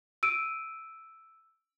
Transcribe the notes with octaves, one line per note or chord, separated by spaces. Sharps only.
E6 D7 D#7